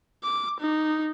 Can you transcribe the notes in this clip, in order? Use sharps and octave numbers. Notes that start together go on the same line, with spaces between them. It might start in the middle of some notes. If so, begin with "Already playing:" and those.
D6
D#4